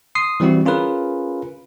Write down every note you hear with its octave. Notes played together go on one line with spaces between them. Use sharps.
C6 D#6 C7
E3 G3 C4 E4 F#4
C#4 F4 G#4 A#4 B4